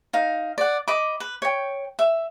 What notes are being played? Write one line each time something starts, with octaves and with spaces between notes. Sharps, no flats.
D#4 F5
D5 F#5
D#5 B5 D6
B4
C#5 G5
E5